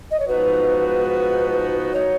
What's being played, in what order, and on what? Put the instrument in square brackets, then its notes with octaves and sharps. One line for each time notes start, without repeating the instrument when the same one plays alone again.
[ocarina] D#5
C#5
[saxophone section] G#2 F3 B3 D#4 F#4 [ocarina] B4
[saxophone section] F#3 A#3 D#4 [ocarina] C#5